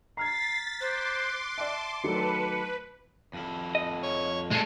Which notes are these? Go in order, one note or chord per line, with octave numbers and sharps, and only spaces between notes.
A#5 F6 G#6 A6 B6 C7
C5 C6 D6 F#6
D5 E5 A5
D#3 F#3 A3 B4 C#7
F2 E4
D#5
C#5
A#2 G#3 A3 A4